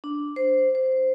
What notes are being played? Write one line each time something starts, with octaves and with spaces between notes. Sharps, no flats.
D4
C5
C5